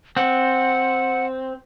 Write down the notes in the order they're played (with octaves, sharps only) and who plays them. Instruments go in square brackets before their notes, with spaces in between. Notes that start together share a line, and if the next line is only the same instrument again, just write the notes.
[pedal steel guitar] C4 [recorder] F#5